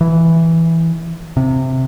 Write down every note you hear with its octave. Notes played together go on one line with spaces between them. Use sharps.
E3
C3